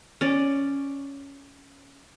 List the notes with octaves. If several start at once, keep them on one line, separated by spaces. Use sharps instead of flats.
C#4 D5